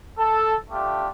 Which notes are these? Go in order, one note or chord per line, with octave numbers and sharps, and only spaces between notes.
A4
A3 D4 F4 G4